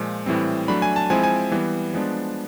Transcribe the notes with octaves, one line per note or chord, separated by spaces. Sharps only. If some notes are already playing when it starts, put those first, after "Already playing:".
Already playing: A#2 F3 G#3
A2 E3 G3 C4
F#3 A3 D4 B5
G#5
A5
F3 G#3 C4 E4 G#5
G#5
E3 G3 B3
F3 G#3 B3 D4